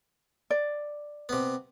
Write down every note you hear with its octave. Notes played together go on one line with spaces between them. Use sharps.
D5
C3 B3